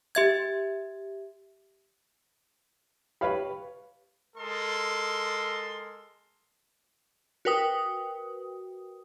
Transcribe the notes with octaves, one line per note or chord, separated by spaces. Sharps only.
G4 E5 G#6
G4 B4 C#5 F5 B5
G#3 A4 A#4 C6
F#4 A#4 B4 G5 D#6